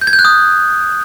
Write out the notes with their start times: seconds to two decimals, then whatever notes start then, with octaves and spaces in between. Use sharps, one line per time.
0.01 G6
0.07 G#6
0.13 G6
0.19 F#6
0.25 D#6